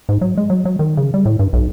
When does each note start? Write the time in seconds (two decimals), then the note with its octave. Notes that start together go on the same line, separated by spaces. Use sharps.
0.09 G#2
0.21 F#3
0.38 G#3
0.50 F#3
0.65 F#3
0.79 D#3
0.97 C#3
1.14 G3
1.25 A2
1.39 G2
1.53 B1